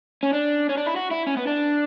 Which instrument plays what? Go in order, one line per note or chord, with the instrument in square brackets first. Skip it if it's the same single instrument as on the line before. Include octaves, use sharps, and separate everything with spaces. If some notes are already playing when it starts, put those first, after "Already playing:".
[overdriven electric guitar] C#4
D4
C#4
D4
E4
F#4
E4
C#4
B3
D4